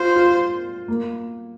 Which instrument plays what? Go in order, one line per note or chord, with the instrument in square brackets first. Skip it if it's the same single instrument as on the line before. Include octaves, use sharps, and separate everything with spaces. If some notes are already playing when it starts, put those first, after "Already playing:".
Already playing: [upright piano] F4 [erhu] C5
[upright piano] F4
A#3